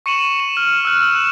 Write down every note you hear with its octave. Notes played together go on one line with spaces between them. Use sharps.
C#6 C#7 D#7 E7 F#7
E7
F6
E6 F#6
E7